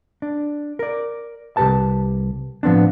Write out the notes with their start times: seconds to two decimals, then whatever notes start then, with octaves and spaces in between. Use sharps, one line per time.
0.22 D4
0.79 A#4 D5
1.57 C2 G2 G4 B4 A5
2.63 A2 F3 B3 C4 D4